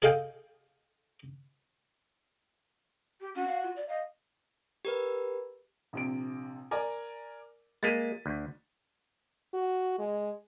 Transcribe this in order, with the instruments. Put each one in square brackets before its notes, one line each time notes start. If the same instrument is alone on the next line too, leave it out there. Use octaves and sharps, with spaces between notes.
[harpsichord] G#4 A4 D#5 F5 G5
[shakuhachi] G4
[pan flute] C#4 [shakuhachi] F#4
[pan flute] F5
F4
D5
[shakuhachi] D#5 [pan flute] F5
[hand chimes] G4 A#4 B4
[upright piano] A#1 C3 D7
A#4 D5 G#5
[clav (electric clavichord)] G#3 A#3 G#4 [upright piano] A6 B6 D#7
[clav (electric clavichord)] D2
[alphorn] F#4
G#3